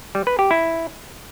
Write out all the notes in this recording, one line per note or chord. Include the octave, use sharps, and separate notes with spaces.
G3
B4
G4
E4